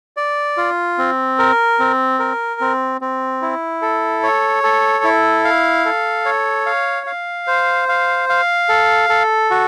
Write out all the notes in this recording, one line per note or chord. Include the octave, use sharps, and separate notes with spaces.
D5
F4
C4
A#4
C4
A#4
C4
C4
E4
A4
C#5
A4
E4
F5
A4
C#5
F5
F5
C5
F5
F5
A4
A4
F#4